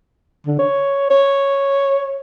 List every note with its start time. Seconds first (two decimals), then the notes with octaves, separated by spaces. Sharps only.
0.46 D3
0.59 C#5
1.10 C#5